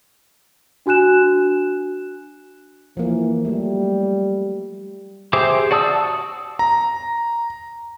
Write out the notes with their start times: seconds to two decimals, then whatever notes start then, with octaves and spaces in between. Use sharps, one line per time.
0.86 D4 F#4 G#5 F#6 E7
2.97 E3 F3 A#3
3.45 F#3 G3 A3
5.33 G4 G#4 C5 E5 D6
5.71 F#4 D5 A5 D#6 E6
6.59 A#5